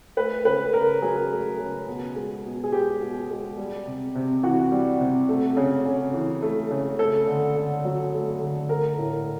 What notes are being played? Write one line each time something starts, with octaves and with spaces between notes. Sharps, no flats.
A3 B4
C#3 B4
C#3 A#4
F#3 G#4
A3
C#3
B2
G#3
B2
G#4
G#3 G4
B2
G#3
G3
C3
C3
E3 F#4
G3
C3
A3
C#3
C#3
E3
A3
C#3
A3 A4
D3
D3
F#3
A3
D3
A3 A#4
A2